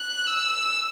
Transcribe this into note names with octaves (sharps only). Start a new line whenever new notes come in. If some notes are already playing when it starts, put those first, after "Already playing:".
Already playing: F#6
E6